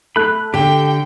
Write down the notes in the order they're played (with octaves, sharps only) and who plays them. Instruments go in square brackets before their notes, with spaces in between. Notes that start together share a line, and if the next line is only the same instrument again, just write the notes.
[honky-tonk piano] A3 [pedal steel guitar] B5 F#6
[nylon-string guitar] D3 [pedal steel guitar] G4 [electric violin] G5